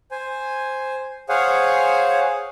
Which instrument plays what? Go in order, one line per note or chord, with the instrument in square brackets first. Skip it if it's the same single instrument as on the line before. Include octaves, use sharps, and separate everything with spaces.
[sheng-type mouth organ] C5 G#5
G#4 C5 C#5 F5 F#5 G#5